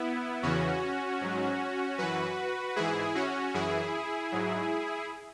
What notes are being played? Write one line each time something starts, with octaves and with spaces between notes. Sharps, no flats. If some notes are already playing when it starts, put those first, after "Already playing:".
Already playing: B3 E4
E2 C#3 E3 C#4 F#4
G#2 F#3
F#2 E3 F#4 B4
G#2 E3 E4 G#4
C#4 F#4
F#2 E3 E4 G#4
G#2 F#3